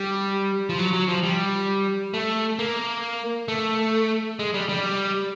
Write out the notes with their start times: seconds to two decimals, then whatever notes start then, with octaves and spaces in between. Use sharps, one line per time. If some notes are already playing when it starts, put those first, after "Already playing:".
Already playing: G3
0.69 F3
0.79 F#3
0.93 F#3
1.08 F3
1.23 G3
2.14 A3
2.59 A#3
3.48 A3
4.39 G#3
4.54 G3
4.69 G3